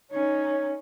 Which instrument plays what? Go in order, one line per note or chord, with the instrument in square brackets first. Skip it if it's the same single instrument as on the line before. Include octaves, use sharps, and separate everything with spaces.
[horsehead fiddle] C#4 D#4 [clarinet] C#5